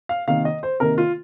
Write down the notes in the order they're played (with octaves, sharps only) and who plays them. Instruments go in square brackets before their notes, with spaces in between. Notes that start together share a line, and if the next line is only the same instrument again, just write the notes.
[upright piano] F5
C3 D#3 A#3 F5
D#5
C5
C3 D#3 A#3 A#4
F4